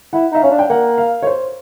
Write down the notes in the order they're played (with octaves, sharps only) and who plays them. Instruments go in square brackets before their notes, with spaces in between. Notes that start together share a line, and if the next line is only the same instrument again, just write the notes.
[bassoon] E4 [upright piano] F#5
[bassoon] D#4 [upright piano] E5
[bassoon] C#4 [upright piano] F5
[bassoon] D4
[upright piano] G5
[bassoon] A#3 [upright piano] F#5
[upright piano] F5
C#5
C5